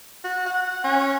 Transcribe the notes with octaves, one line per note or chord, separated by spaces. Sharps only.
F#4
F#5
C#4